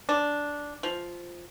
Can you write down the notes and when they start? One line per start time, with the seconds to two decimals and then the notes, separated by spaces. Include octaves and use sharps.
0.09 D4
0.83 F3